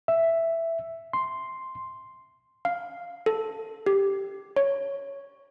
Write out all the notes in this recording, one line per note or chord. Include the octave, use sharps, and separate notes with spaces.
E5
C6
F5
A4
G4
C#5